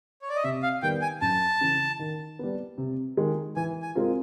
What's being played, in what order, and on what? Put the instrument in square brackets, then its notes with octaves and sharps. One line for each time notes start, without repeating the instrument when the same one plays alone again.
[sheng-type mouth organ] C#5
D5
D#5
[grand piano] C3 [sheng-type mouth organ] E5
[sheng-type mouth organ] F5
[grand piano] D#3 G3 B3 [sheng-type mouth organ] G5
[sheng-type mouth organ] G#5
[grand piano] F#2 [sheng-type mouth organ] A5
[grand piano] C#3 E3
D#3
G3 B3
C3
D#3 G#3
[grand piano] E3 [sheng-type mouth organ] G#5
[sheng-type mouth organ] G#5
[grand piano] G#3 C4 F4 A#4